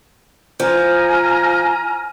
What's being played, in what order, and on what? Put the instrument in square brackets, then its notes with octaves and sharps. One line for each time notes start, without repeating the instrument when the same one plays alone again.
[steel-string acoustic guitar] F3 [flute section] G#5 A#5 F6